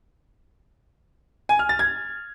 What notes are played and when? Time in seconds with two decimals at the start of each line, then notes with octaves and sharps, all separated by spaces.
1.49 G#5
1.59 F6
1.69 A6
1.79 G#6